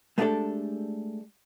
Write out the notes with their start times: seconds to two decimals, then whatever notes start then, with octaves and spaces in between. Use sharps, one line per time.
0.18 G#3 A3 B3 D4 G4 A4